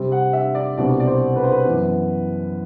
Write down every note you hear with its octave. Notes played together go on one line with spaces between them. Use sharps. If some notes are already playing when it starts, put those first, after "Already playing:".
Already playing: C3 G3 C4
F#5
E5
D5
C2 B2 G3 C4 D5
D5
C5
B4
C5
B4
F#2 E3 B3